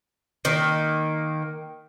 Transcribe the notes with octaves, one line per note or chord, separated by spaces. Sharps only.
D#3 A#3